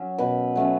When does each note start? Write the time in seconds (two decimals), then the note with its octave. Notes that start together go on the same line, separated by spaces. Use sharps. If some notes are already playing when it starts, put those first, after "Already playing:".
Already playing: F#3 C#4
0.18 B2 B4
0.55 F#3 A3 C#4